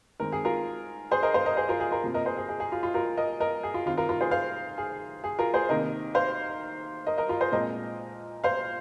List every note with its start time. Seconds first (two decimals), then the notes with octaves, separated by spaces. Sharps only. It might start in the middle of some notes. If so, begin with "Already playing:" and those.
0.20 D#3 G#3 C4 A#4
0.32 G#4
0.45 F4 A#4
1.11 G#4 C5
1.23 A#4 D#5
1.34 C5 F5
1.46 A#4 D#5
1.57 G#4 C5
1.69 F4 A#4
1.80 G#4
1.92 F4 A#4
2.03 C3 F3 A#3
2.14 A#4 D#5
2.26 G#4 C5
2.37 G#4
2.49 G#4
2.60 G#4
2.72 F4
2.83 F4
2.94 F4 A#4
3.17 A#4 D#5
3.40 A#4 D#5
3.63 G#4
3.74 F4
3.86 D#3 C4 F4
3.97 F4 A#4
4.09 F4 A#4
4.21 G#4 C5
4.31 C5 F5
4.78 G#4
5.24 G#4
5.39 F4 A#4
5.54 G#4 C5
5.69 C3 D#3 A#3 A#4 D#5
6.15 C5 F5
7.07 A#4 D#5
7.18 A#4 D#5
7.29 F4 A#4
7.41 G#4 C5
7.52 A#2 F3 G#3 C4 A#4 D#5
8.44 C5 F5